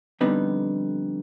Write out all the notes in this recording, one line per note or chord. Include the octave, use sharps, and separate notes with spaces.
F2 D3 G3 B3 D#4